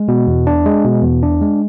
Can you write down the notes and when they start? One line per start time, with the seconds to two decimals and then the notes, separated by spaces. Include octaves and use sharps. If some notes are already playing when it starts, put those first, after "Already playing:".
Already playing: G#3
0.08 B2
0.27 E2
0.47 D4
0.66 G#3
0.84 B2
1.03 E2
1.23 D4
1.41 G#3